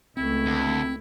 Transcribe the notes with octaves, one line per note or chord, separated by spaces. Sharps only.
C#2 A3 C4 E4
D2